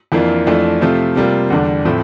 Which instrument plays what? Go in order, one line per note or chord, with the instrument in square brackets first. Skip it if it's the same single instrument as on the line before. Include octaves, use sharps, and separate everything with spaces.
[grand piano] F2 E3 A#3 D4 F4
F2 E3 A3 D4 F4
C3 F3 A3 C4 F4
C3 G3 A#3 F4
E2 D3 G3 D4
A2 F3 A3 C4